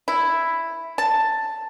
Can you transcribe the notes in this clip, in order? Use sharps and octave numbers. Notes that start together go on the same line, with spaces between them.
E4
A5